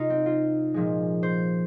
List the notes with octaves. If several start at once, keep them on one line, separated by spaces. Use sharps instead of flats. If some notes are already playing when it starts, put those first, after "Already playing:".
Already playing: C3 G#3 D#4 F4
C4
F4
A#2 F3 G#3
C5